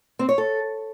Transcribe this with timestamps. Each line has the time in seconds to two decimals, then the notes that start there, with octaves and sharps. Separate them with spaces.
0.19 C4
0.29 C#5
0.38 A4